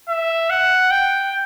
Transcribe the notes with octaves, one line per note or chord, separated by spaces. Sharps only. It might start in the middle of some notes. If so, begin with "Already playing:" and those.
E5
F#5
G5